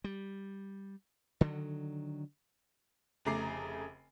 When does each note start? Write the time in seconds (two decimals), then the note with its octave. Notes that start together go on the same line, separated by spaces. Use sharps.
0.04 G3
1.41 D3 D#3 F#3
3.25 F1 C#3 A3 A#5 D6 C7